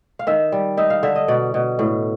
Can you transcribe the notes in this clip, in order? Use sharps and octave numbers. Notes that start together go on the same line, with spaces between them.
F5
D#3 E5
G3
D#4 E5
F5
D3 E5
D#5
B2 D5
B2
A2